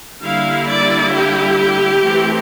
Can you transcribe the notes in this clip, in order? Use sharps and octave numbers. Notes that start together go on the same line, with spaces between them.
D3 G3 A#3 E4 F5
D5
G4
E3 A3 C4 E4